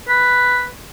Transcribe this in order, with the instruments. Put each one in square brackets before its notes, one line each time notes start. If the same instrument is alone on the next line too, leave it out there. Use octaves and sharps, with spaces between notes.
[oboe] B4